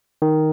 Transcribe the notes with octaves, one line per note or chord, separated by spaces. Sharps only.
D#3